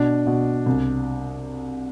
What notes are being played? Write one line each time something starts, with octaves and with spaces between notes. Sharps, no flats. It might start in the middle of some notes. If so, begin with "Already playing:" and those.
Already playing: B2 D4
B2
C2